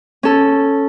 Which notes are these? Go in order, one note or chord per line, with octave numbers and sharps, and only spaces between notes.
C#4 A4